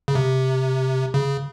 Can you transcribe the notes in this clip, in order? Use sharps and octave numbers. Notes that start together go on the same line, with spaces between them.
C#3
C3
C#3